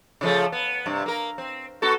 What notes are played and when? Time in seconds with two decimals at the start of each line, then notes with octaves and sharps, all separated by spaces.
0.21 C#3 F3 A3
0.52 B3
0.86 G2 C3
1.06 A#3 A#4
1.38 C4
1.82 B3 F#4 A4